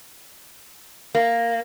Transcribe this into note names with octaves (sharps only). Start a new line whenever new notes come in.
A#3